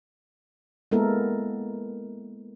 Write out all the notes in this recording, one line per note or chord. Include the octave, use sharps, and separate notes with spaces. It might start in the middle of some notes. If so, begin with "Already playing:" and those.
G#3 A#3 B3 E4 A4 A#4